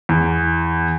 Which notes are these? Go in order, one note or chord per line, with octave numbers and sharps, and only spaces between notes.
E2